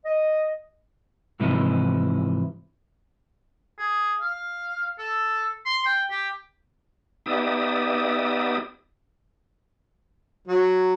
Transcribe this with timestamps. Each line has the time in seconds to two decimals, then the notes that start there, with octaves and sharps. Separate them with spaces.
0.05 D#5
1.40 G#2 C3 E3 F3 D#4 E4
3.78 G#4
4.21 F5
4.99 A4
5.66 C6
5.85 G5
6.11 G4
7.26 B3 D#4 G4 D5 E5 D#6
10.48 F#3